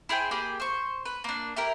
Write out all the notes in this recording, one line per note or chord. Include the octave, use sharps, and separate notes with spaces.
E4 G#4 C5 G5
A#3 G4 G#4 B5
C5 C#6
B4
A#3 D4
E4 G4 A#4